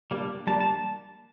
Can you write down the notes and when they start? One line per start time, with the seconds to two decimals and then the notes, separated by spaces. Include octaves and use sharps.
0.11 G3 A#3 D4
0.47 G3 A#3 D4 A5
0.60 A5